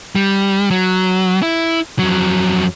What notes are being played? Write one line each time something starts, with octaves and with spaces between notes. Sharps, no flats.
G3
F#3
E4
F2 F#3